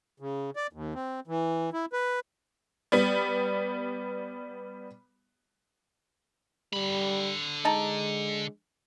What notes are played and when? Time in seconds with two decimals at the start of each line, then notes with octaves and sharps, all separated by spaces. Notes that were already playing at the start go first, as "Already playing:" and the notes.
0.20 C#3
0.56 D5
0.73 D#2
0.94 C4
1.28 E3
1.73 E4
1.93 B4
2.92 G3 B3
6.73 D3 G3 B5
7.65 G#3 D#4 A5 A#5